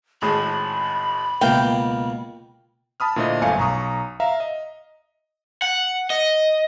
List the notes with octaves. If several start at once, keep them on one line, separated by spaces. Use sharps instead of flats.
G#1 A2 G#4 B5
C#2 B2 A#3 F5 G5
A5 B5 D#6 F6
A#2 D3 A3 E4 C5 D#5
G1 F#2 A3 F5 G#5 C#7
B1 A#5 C#6 D#6
E5 F5 A#5
D#5
F#5
D#5